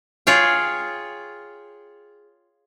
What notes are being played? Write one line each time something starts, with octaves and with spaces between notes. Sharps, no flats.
F4 G#4 C#5 G5